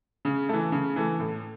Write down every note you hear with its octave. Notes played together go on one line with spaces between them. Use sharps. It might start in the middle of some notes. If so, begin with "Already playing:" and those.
C#3
E3 A3
C#3
E3 A3
A2